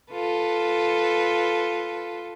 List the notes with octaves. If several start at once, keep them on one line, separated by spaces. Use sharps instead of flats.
F4 A4 B4